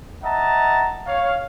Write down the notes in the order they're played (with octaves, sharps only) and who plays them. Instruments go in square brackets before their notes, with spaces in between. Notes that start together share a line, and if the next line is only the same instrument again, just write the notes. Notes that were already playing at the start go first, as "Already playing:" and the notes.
[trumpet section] D#5 E5 F#5 A5 A#5
C#5 F5